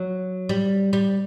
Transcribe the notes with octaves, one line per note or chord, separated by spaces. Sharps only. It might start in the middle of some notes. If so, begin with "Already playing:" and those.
Already playing: F#3
G3
G3